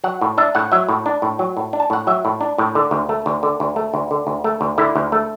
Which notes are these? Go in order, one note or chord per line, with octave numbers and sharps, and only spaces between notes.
F#3 F#5
A2
D4 E5
A2 F#5
F#3 E5
A2
D4
A2
F#3
A2
D4
A5
A2 F#5
F#3 E5
A2
D4
A2
D3
D2
A3
D2
D3
D2
A3
D2
D3
D2
A3
D2
D3 E4
D2
A3